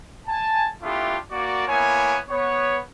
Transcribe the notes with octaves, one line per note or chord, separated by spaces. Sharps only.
G#5 A5
A3 B3 D4 E4 F4 G4
A#3 F#4 D5
A#3 B3 E4 C#5 G#5
B3 C#5